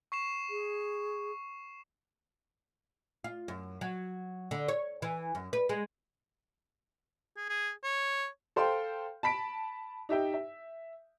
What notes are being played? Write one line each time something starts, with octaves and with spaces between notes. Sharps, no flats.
C#6 C7 E7
G#4
F4
F#2
F#3
D3
C#5
E3
F#2
B4
G#3
G#4
G#4
C#5
A4 C5 F5 G5 C6
A5 B5 B6 D7
D#4 G4 E5 G5
E5